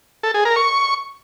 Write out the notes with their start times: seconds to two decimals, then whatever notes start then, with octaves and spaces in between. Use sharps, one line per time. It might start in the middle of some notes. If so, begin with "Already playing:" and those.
0.23 A4
0.34 G#4
0.45 A#4
0.56 C#6